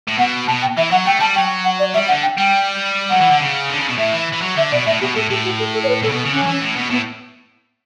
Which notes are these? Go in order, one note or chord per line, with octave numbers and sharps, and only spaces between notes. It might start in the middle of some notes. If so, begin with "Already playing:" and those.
A2
B2 F#5
B2 A5
G5
E3 E5
F#3 F#5
A3 G5
G3 A5
F#3 G5
F#5
D5
G3 E5
D3 F#5
G5
G3 G5
F#3 F#5
E3
D3
C#3
D3
C#3
B2
A2 E5
E3
E3
F#3
D3 E5
B2 D5
A2 E5
B2 G4
A2 A4
A2 G4
F#4
A4
A4
C#5
B4
A2 A4
C#3
B2
C#3
D3 C#4
F#3
E3
A2
B2
A2 B3